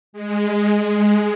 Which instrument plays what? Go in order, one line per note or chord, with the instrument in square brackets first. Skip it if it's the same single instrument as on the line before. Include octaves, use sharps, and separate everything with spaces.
[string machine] G#3